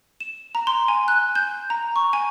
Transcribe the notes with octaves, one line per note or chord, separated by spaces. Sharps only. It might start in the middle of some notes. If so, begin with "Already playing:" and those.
E7
A#5
C6
G#5
F#6
G6
A#5
C#6
G#5